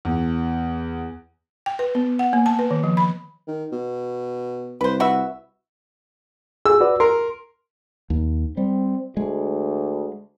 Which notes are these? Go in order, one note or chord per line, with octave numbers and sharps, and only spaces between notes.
E2
G5
B4
B3
F#5
A#3
A5
B4
D#3
F3
B5
D#3
B2
C2 B4 C5
F#4 B4 E5
G#4 E6
F#4 B4 D5
A#4 C6
D#2
G3 C4
D2 G#3